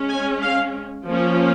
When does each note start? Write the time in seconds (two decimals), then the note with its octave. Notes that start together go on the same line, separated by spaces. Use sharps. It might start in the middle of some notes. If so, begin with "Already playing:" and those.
Already playing: G#3 C#4
0.09 G#5
0.42 F5
1.07 F3 A#3 C#4